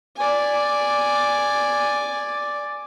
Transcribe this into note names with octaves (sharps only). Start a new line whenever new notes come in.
D5 G#5